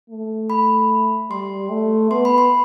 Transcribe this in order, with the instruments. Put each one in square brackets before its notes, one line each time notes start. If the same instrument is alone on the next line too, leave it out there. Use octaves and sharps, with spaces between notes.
[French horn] A3
[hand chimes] B5
[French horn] G3 [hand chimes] C6
[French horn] A3
[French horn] B3 [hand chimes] C6
[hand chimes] B5
C6